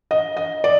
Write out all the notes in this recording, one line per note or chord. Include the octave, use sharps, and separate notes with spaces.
D#5
D#5
D5